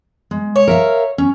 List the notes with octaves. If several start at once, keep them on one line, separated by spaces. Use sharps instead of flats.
G#3
C#5
A#4 E5 F5
C#4